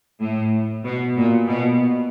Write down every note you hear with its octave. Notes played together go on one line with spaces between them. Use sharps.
A2
B2
A#2
B2